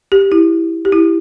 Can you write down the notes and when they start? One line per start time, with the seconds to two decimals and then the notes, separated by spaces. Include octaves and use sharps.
0.12 G4
0.32 E4
0.85 G4
0.92 E4